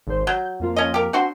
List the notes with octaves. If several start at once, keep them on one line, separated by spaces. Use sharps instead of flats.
G#1 C5
F#3 G6
F2 A#3 F4
C#4 D#5
G4 A#4
C4 D4 F#4 C6